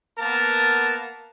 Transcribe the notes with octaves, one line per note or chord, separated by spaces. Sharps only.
A#3 B3 A#4 A5